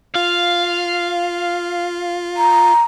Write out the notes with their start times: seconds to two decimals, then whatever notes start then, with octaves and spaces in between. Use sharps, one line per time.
0.15 F4 F5
2.37 A#5